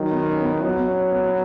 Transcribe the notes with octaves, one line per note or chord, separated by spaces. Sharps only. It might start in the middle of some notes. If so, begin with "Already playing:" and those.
Already playing: D#3 F#3
B3
C#4
B3
C#4
F#3 B3
B3
C#4
C#4
B3
B3